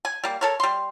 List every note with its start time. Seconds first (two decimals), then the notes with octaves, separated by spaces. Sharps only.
0.05 G#5
0.24 G3 A#3
0.41 A4 A#4 C#5
0.60 G3 C6